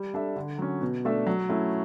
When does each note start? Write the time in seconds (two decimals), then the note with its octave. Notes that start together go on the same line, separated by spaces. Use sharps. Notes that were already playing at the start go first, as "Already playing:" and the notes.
Already playing: G3
0.14 D4 A4 E5
0.36 D3
0.58 F#3 C#4
0.81 B2
1.05 A3 D4 A4 E5
1.27 F#3
1.49 A3 C#4 E4